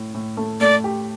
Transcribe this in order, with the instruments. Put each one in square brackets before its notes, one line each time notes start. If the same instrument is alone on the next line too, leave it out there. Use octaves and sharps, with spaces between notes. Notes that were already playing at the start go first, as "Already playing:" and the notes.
Already playing: [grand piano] A2
A2
A3
[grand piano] A3 [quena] D5
[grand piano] G4